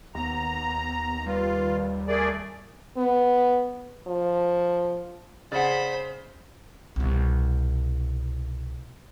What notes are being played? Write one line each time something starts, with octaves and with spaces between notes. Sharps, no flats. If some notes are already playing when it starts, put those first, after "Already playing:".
D#2 B3 A#5
G3 F4 B4
A3 G#4 A#4 D5
B3
F3
C#3 G#4 C5 D5 F#5 B5
C2 B2